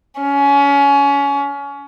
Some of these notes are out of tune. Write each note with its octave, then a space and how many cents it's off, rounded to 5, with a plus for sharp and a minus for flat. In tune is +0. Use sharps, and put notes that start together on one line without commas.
C#4 +25